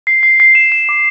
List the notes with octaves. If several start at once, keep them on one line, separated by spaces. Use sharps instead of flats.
C7
C7
C7
E7
E7
D6